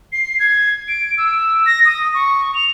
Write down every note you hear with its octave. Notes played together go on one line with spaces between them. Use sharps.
C7
G#6
D7
E6
A#6
D#6
C#6
F7